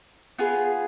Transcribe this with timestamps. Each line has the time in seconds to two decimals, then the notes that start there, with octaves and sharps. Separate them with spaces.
0.39 B3 F4 G#4